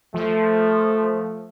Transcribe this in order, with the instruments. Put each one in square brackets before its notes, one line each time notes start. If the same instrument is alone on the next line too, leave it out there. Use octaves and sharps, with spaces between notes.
[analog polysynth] F3 [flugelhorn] A3